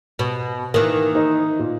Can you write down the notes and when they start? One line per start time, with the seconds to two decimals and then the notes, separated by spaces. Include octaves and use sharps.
0.19 B2
0.74 D#3 E3 A#3
1.15 D#4
1.59 A#2